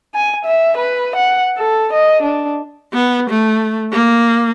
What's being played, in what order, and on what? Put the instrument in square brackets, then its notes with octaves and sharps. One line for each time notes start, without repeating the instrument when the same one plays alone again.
[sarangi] G#5
E5
B4
F#5
A4
D#5
D4
[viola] B3
A3
A#3